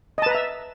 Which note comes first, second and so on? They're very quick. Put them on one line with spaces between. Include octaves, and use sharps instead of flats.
D#5 A5 B4 A#5 E5